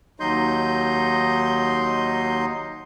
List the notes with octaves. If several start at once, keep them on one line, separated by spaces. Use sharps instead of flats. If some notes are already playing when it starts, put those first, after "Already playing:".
D#2 F#3 D#4 D#5 C6 G6